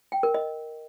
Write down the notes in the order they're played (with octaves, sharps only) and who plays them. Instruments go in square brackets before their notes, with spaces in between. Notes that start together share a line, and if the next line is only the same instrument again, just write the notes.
[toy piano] G5
A#4
D#5